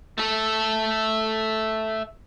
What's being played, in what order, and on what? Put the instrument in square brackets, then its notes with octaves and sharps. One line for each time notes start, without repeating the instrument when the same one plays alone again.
[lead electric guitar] A3 A4